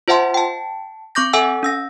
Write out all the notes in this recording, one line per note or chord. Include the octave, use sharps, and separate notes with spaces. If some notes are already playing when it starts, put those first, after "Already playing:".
F4 C5 E5 F#5 A5 C6
G5 A5
C4 C#6 D6 G6 A#6
A4 E5 F#5 G#5 E6
C#4 E6 A#6